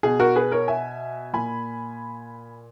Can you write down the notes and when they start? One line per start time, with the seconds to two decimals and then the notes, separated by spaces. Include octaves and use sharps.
0.03 B2 G#4
0.20 F#4 A#4
0.36 G#4 B4
0.52 A#4 C#5
0.68 E5 G#5
1.33 A#2 G#5 B5